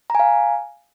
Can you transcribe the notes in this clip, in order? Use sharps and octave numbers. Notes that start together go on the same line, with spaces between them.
F5 G#5 A#5